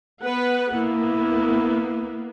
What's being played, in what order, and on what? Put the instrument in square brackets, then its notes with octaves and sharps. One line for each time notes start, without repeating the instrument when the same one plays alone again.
[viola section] B3 B4 F#5
[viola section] A#3 B3 [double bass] E4